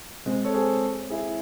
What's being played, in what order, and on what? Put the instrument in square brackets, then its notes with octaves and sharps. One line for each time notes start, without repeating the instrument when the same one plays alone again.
[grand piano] G#3 C4
A4 C#5
G#4 C5
E4 G#4